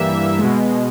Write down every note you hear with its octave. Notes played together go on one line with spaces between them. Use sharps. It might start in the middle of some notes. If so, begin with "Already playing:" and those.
Already playing: G2 E3 G3 A#3 E5
B2 G#3